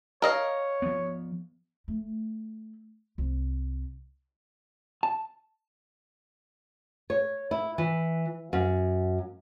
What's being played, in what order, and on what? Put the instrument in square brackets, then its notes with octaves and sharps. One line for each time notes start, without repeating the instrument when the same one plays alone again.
[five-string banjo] A#4 D#5 F5 [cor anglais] C#5
[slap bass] F3 B3
[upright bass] A3
C2
[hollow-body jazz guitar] A5
[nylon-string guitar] C#5
E4
E3
F#2